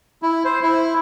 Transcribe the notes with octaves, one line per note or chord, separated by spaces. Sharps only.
E4
C5
E4